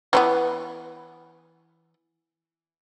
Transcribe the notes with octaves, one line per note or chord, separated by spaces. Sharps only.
E3 F#3 B3